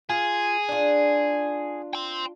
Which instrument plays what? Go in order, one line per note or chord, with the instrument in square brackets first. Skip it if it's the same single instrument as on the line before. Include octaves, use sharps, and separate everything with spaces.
[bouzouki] F4 [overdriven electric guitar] G#4
[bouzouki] D4 F4
[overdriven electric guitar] G5 C6